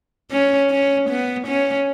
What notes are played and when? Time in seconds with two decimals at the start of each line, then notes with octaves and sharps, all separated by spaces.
0.31 C#4
0.70 C#4
1.09 B3
1.47 C#4